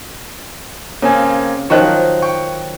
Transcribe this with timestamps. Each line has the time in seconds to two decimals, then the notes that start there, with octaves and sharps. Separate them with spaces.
1.02 C#3 A#3 C4 G#5
1.70 D#3 F3 F#3 C#6 F#6
2.22 G5 C#6